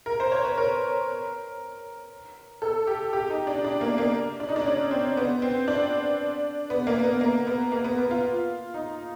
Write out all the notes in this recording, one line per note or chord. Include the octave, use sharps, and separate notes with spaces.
A#4
C5
C#5
B4
A#4
A4
G4
G4
D#4
D4
D4
A#3
A#3
D4
D#4
D4
C#4
C4
B3
C4
D4
B3
A#3
B3
A#3
B3
A#3
B3
B3
F4
D#4